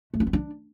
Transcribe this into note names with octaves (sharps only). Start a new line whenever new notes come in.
A3
D4
B3
D4